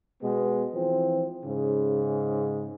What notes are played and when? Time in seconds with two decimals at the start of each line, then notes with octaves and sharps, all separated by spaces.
0.22 B2 G#3 B3
0.73 E3 F3 C4
1.44 G#2 C#3